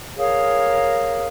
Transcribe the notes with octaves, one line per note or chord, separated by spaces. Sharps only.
G#4 A#4 C#5 F5